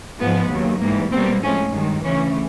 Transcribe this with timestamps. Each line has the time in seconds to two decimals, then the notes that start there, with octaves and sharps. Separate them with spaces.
0.19 G#2 F3 G#3 B3
0.50 D#2 C#3 F#3
0.81 G#2 E3 G3 A#3
1.12 B2 G3 A#3 C4
1.42 A2 F3 G#3 C#4
1.73 G2 D#3 G#3
2.04 D2 C#3 E3 C#4